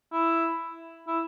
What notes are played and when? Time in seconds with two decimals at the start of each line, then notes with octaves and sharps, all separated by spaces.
0.12 E4
1.08 E4